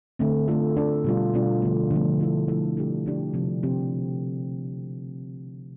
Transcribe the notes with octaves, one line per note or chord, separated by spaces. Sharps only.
D3 A3 C4
A3 D4 F4 A4
A3 D4 F4 A4
B2 G3 D4 F4
B2 G3 D4 F4
D3 F3 A3
D3 F3 A3
F3 A3 E4 A4
F3 A3 E4 A4
A3 D4 G4
A3 D4 G4
C3 F3 C4 G4
C3 F3 C4 G4